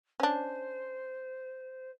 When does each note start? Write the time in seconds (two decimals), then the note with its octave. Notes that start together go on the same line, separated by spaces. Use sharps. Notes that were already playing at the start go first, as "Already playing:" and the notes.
0.20 C#4 D4 C5